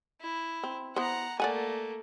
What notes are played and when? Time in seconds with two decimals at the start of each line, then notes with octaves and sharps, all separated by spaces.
0.21 E4
0.63 C4
0.96 B3 E4 C5 F#5 A#5
1.40 A3 A#3 D5 F#5 G#5